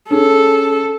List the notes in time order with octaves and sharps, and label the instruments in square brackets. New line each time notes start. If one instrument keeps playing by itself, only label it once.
[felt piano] C#4 G#4 [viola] A4